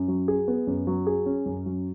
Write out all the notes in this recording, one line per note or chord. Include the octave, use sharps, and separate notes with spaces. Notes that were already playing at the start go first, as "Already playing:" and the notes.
Already playing: F#2
F#3
G#4
B3
F#2
F#3
G#4
C#4
F#2
F#3